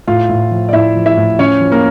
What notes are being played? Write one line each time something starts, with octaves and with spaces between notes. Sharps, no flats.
A2 F4 F5
A2
F3
D5
A2 E4 E5
F3
E4 E5
A2
F3 C#4 C#5
F3
A#3 A#4